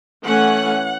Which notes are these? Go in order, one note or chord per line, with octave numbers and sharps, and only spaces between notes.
E3 A3 C#4 F#5